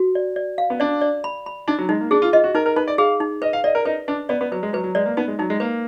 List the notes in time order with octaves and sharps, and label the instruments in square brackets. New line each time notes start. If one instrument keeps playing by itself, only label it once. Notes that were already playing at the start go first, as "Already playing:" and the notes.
Already playing: [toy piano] F#4
D5
D5
F5
[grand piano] B3
[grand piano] D4 [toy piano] D5
[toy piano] D5
B5
B5
[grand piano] D4 [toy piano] D#4
[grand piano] F#3
[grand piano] G#3 [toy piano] D#4
[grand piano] A#3
[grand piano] D4 [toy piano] G#4
[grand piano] F4
[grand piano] F4 [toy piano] D#5
[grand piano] F#4
[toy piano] D#4 [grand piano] A#4
[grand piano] A#4
[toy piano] D#4 [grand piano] B4
[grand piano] D5
[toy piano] G#4 [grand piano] F5
[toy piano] D#4
[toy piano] B4 [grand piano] D#5
[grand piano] F5
[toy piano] D5 [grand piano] D#5
[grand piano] A#4
[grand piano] D#4 [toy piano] B4
[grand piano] D4 [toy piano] B4
[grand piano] B3 [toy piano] D5
[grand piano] B3
[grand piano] F#3 [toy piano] B4
[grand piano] G#3
[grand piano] F#3 [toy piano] B4
[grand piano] F#3
[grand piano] G#3 [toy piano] D5
[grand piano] A#3
[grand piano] B3 [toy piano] D#4
[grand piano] G#3
[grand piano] F#3 [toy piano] D#4
[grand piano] G#3
[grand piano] A#3 [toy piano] B4